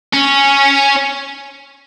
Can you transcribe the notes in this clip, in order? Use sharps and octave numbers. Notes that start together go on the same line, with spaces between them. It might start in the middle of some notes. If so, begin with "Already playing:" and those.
C#4